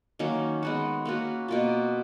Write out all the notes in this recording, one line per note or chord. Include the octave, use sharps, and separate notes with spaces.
D#3 F#3 A#3 C#4
G#3 B3 F#4
A#3 C#4 F#4 B4
B2 A#3 F4